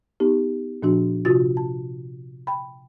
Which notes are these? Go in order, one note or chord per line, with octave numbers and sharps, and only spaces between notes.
B3 D#4 G4
A#2 F3 D4 F#4
C3 F4 F#4 A6
A5
G5 B5